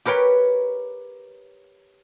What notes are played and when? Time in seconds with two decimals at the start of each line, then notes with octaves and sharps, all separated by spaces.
0.06 G4 A#4 B4 C#5 G5